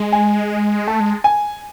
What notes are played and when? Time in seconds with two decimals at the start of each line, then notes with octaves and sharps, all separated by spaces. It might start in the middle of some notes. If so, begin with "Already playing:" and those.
Already playing: G#3
0.12 G#5
0.88 A3 A5
1.00 G#3
1.24 G#5